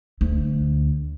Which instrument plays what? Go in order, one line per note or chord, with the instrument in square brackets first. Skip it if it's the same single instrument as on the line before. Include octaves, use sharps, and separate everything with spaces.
[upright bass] D2